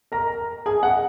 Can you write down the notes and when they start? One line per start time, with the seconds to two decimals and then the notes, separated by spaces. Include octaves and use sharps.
0.12 A#4 A#5
0.66 G#4 G#5
0.83 F#5